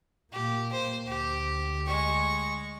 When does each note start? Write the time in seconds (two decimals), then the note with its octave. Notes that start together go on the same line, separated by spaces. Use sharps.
0.33 A#2 A#3 G4
0.72 C5
1.07 D2 G4
1.87 G#3 C#6